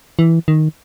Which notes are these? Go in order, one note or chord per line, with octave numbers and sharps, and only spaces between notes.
E3
D#3